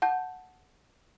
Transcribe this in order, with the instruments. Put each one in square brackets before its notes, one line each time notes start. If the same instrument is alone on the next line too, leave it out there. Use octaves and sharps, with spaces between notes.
[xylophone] F#5 A5 G6